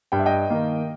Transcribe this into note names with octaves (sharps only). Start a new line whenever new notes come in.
G2 G5
E5
D#5 G5
D#3 A#3